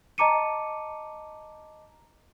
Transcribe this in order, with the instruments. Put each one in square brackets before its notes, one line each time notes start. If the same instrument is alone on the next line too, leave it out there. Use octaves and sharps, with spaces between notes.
[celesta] D#5 A5 A#5 D6 C#7 D#7